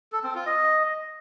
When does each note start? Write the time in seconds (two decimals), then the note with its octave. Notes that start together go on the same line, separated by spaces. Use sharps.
0.12 A4
0.24 C4
0.35 F4
0.46 D#5